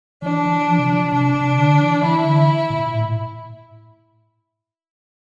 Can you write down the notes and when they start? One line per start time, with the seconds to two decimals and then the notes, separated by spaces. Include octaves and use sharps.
0.22 E3 D4
0.45 E3
0.67 F3
0.78 C3
0.90 F3
1.12 C3 D4
1.35 C3
1.58 D3
1.80 E3
2.02 E3 E4
2.25 D3
2.70 A#2
2.92 A2